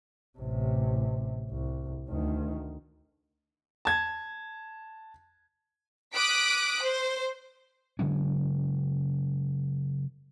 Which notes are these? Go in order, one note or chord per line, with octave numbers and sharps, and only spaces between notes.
A1 C3
C2
D2 D#3
A5 G#6
D6 D#6 F#6 B6 D7
C5
C#3 F#3 G#3 C#4